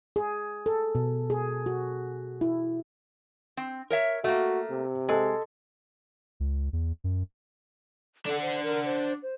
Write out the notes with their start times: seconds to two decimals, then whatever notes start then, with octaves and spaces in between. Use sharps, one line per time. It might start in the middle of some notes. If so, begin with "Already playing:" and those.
0.16 G#4
0.66 A4
0.95 B2
1.30 G#4
1.66 F#4
2.41 E4
3.57 C4
3.90 A#4 C#5 E5
4.24 A3 A#3 F#4 E5
4.70 C3
5.09 G#3 A4 D#5
6.40 C#2
6.73 E2
7.04 F#2
8.26 D4 A4 F#5
8.42 C5
8.63 A#4
8.85 C5
9.23 C5